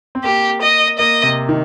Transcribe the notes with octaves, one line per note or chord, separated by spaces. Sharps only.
C4
A#3 G4
D#5
A#3 D#5
C3
D#3